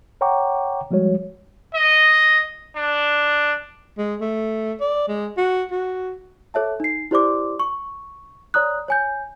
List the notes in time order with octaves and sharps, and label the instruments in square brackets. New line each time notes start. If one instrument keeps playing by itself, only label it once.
[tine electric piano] C#5 F#5 G5 A#5 C#6 D6
F3 G3 G#3 F#4 C#5
[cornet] D#5
D4
[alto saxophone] G#3
A3
D5
G#3
F#4
F#4
[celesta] A4 C#5 E5 A5
D#4 C7
E4 G4 C5 D5 C6 D6
C#6
C#5 D5 A#5 D#6 F#6
C#5 G#5 G6